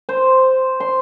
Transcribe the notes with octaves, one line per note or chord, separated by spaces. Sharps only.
C5
C6